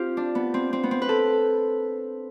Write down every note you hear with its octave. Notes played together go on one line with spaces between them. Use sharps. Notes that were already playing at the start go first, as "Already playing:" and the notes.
Already playing: C4 F4 G4
D4
B3
C4
C4
B3
C4
B4
A4